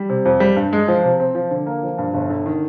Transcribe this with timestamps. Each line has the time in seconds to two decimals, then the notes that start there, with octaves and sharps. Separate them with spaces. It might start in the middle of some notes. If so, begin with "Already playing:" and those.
Already playing: G3
0.09 C3
0.25 F2
0.40 G3
0.56 G2
0.73 G#3
0.88 F3
1.03 C3
1.20 C4
1.35 F3
1.51 D3
1.66 A#3
1.83 F3
1.98 G2
2.14 G1
2.30 D3
2.46 D#3